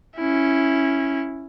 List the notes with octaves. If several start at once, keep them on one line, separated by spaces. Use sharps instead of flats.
C#4 E4